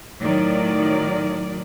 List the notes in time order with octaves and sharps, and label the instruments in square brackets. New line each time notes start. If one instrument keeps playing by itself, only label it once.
[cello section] A2 D#3 F#3 D5